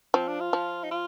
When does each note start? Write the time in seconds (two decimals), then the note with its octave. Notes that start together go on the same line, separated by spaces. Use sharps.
0.14 F3 C4
0.28 D4
0.40 F4
0.53 F3
0.84 D#4
0.91 F4